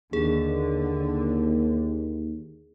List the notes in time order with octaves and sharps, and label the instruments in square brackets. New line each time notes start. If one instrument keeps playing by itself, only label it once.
[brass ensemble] D#2 [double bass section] D3 [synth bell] G#4